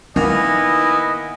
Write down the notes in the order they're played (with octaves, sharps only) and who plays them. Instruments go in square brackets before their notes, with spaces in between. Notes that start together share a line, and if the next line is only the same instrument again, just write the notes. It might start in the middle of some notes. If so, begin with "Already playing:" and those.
[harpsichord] D#3 A#3 [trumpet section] B3 E4 G#5 [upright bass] D#4 [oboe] D#5